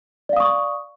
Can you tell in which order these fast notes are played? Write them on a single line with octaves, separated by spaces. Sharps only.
D5 F5 D#6 C#6